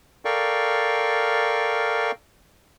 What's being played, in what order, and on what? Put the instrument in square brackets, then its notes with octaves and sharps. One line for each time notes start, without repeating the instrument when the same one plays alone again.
[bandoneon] A4 A#4 D5 F5 G5 C#6